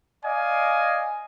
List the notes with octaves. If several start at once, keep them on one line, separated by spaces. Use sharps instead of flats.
D5 D#5 F5 G#5